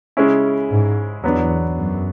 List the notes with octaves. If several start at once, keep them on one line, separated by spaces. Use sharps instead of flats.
C#3 G#3 C#4 E4
G#2
E2 F#3 B3 D4
F#2